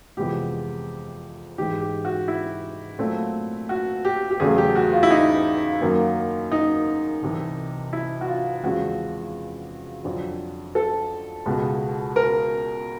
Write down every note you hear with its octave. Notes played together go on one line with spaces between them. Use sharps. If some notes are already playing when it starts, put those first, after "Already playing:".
F2 C3 E3 G#3 B3 G4
G#2 E3 G#3 G4
G4
F#4
E4
A#2 F#3 A3 C4
F#4
G4
G4
E2 C#3 F#3 A3 G#4
G4
F#4
F4
E4
D#4
F#2 D#3 F#3 A#3
D#4
C2 C3 E3
E4
F#4
F4
E2 C#3 F3 G#3 C4 F#4
F2 D3 F#3
A4
C#2 B2 G#3 B3
A#4